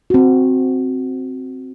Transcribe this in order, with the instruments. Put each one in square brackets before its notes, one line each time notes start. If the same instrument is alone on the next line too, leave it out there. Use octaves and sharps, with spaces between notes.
[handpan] C4 F#4